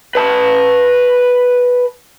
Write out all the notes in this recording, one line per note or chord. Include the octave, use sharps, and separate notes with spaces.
B4 A5